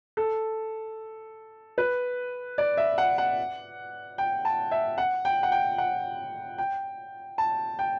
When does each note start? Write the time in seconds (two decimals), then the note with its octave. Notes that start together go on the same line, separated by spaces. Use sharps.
0.17 A4
1.78 B4
2.58 D5
2.77 E5
2.98 F#5
3.18 F#5
4.18 G5
4.45 A5
4.71 E5
4.98 F#5
5.25 G5
5.43 F#5
5.52 G5
5.78 F#5
6.58 G5
7.38 A5
7.79 G5